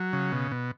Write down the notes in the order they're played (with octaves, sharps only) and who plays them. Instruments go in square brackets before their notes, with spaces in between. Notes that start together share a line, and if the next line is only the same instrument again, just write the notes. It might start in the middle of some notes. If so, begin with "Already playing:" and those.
Already playing: [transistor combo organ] F#3
C#3
B2
B2